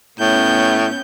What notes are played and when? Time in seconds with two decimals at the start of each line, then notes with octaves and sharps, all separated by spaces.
0.20 A2 B3 C#4 G6